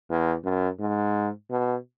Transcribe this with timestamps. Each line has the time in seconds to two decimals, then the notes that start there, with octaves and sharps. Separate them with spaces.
0.10 E2
0.44 F#2
0.80 G#2
1.51 B2